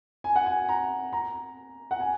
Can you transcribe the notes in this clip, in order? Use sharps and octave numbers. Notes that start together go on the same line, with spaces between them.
G#5
F#5
G#5
A#5
A#5
F#5
G#5